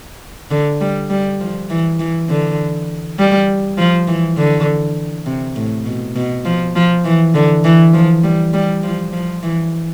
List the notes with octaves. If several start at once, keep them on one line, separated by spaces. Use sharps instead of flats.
D3
G3
G3
F3
E3
E3
D3
G3
F3
E3
D3
C3
A2
B2
B2
F3
F3
E3
D3
E3
F3
G3
G3
F3
F3
E3